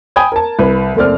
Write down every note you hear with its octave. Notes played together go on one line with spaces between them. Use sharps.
G5 G#5 B5 D#6 G#6
A#4 A5
C2 B4
F#1 A3 C4 D5 F6